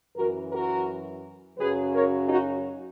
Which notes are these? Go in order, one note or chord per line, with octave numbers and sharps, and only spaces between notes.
F#2 E3 F#4 A#4
F#4 A#4
F#2 C#3 F#3 G#4 B4
A#4 C#5
D#4 F#4